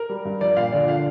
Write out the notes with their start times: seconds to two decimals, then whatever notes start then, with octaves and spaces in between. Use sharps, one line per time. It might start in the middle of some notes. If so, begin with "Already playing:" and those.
Already playing: A#4
0.09 G3
0.25 G2
0.41 F3 D5
0.57 A#2 F5
0.72 D3 D5
0.88 F5